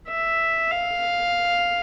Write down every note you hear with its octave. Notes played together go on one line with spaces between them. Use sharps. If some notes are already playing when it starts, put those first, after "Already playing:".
E5
F5